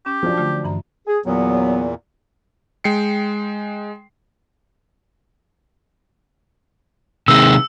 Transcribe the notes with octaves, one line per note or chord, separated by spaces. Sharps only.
C#4 G4
F3 F#3 D4
D3 A3 F4
G2 E3 A#5
G#4
E2 A#2 F#3 B3
G#3 G5 C7 C#7
C3 D#3 G#3 E6